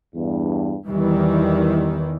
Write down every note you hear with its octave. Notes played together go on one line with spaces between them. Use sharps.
E2 G2
E2 D#3 E3 G3